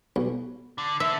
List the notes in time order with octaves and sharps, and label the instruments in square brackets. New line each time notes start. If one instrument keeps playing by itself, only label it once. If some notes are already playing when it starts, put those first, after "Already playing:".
[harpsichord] B1
[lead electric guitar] D3
[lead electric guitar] D3 [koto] E5